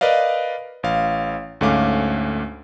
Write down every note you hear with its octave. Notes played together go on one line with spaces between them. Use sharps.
A#4 B4 D5 D#5 F5
A1 F5
D2 G#2 A3 C#4 F5 D6